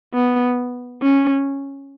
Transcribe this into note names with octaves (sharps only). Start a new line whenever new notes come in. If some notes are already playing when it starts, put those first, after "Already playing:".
B3
C#4